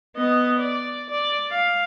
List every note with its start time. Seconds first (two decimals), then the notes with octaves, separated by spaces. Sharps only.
0.16 B3 D#5
0.59 D5
1.10 D5
1.51 F5